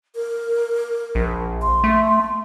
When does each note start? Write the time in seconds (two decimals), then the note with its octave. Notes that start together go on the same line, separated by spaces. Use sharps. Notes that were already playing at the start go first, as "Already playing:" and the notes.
0.15 A#4
1.15 A#1
1.62 C6
1.84 A3